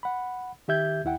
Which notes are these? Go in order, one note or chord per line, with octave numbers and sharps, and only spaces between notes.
F#5 B5
D#3 G4 E5 G6 G#6
D#2 E4 F#5 G5